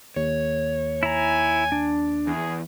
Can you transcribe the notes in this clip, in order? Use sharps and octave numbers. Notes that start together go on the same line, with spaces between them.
D#2 C#5
E4 G#5 A#5
D4
E2 G#4